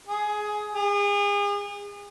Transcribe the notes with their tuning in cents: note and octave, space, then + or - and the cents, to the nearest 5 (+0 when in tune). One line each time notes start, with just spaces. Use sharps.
G#4 +15
G#4 -35